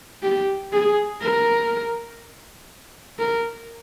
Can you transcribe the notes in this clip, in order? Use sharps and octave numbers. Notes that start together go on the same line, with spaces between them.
G4
G#4
A#4
A#4